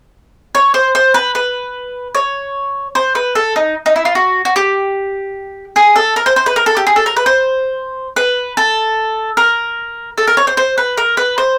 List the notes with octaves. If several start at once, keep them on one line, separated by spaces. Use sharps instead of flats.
C#5
C5
C5
B4
B4
C#5
C5
B4
A4
D#4
D#4
E4
F4
F#4
F#4
G4
G#4
A4
A#4
C5
C5
B4
A#4
A4
G4
G#4
A4
A#4
B4
C5
B4
A4
A#4
A4
A#4
C#5
C5
C5
B4
A#4
B4
C5